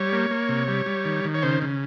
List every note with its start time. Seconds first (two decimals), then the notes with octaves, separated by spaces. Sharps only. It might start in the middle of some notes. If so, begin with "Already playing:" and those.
Already playing: G3 C#5
0.13 A#3
0.31 A#3
0.49 C3
0.68 G3
0.86 G3
1.05 D#3
1.24 D#3
1.34 C#5
1.42 C#3 C5
1.62 C#3